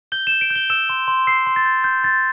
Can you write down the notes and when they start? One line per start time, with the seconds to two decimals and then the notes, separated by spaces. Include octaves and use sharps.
0.12 G6 G7
0.27 E7
0.32 G6
0.41 D7
0.50 G6
0.56 G7
0.70 E6 E7
0.89 C6
1.08 C6
1.27 E6 C7
1.47 C6
1.56 A6
1.65 G6
1.84 G6
2.04 C6 A6